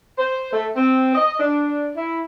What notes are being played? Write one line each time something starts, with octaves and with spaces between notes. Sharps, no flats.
C5
A3
C4
D#5
D4
E4